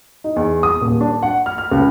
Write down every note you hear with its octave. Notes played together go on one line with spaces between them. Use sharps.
D#4
E2
D#6
D#1
D4
F#5
F6
F6
C#2